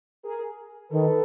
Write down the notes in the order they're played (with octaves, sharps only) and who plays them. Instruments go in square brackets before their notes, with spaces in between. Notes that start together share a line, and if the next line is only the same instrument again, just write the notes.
[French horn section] G#4 A#4
[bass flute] D#3 [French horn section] A4 B4